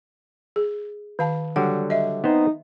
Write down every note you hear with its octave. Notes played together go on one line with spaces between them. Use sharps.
G#4
D#3 F5 A5
D3 F#3 G3 F#5
D#5 E5
B3 C4 D#4 C5